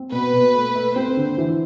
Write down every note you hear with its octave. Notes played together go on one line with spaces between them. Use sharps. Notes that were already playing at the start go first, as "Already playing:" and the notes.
Already playing: C4
B2 B4
B2
A3
A3
C4 C5
D3
E3